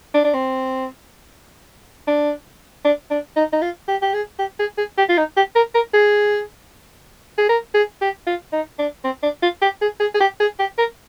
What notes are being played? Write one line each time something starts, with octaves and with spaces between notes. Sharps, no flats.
D4
D4
C4
D4
D4
D4
D#4
D#4
F4
G4
G4
G#4
G4
G#4
G#4
G4
F4
D#4
G4
A#4
A#4
G#4
G#4
A#4
G#4
G4
F4
D#4
D4
C4
D4
F4
G4
G#4
G#4
G#4
G4
G#4
G4
A#4